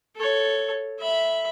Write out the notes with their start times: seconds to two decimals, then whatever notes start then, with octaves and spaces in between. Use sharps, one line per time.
0.16 A4 C#5
1.00 E5 B5